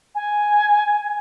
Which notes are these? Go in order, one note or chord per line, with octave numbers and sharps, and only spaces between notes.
G#5